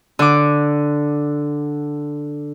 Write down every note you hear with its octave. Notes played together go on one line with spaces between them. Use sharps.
D3 D6